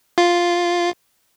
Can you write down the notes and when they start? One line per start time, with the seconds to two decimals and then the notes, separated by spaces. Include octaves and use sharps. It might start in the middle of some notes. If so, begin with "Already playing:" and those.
0.18 F4